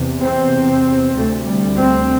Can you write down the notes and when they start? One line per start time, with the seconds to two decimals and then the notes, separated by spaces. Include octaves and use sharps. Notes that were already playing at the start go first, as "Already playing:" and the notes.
Already playing: E2 C3
0.21 C4
1.14 D2 C3 A3
1.46 G3
1.77 C4